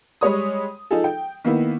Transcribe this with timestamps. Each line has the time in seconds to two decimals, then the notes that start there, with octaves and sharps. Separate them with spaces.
0.21 G3 G#3 C#5 D#6
0.91 F3 D#4 F4 G#4 A4
1.04 G5
1.44 D#3 A#3 B3 E4